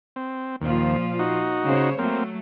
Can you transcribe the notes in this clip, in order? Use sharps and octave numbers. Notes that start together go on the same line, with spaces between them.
C4
D#2 A#2 F3 F4
D#4 F#4
C#3 C5 C#5
F#3 A3 A#3 C4